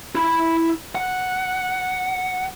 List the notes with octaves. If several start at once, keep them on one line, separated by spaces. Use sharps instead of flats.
E4 B5
F#5